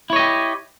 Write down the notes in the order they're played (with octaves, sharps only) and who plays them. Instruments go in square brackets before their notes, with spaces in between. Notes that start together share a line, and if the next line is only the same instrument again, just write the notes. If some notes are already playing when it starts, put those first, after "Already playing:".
[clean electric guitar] E4
C#5
D#5
G4